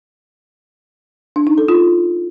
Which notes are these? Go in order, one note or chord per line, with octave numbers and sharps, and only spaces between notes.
D4
D#4
A4
F4